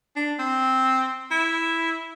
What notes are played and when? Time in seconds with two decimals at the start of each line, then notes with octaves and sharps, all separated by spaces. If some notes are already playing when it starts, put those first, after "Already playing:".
0.16 D4
0.39 C4
1.31 E4